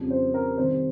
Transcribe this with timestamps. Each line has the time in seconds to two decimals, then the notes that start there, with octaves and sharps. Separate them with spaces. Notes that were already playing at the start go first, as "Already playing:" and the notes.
Already playing: F2 C#3 G3
0.10 C5
0.34 A#4
0.57 C3 D#3 G3 C5